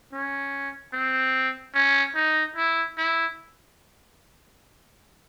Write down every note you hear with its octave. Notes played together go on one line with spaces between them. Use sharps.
C#4
C4
C#4
D#4
E4
E4